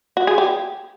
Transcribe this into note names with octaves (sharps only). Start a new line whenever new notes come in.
F#4
G#4
G4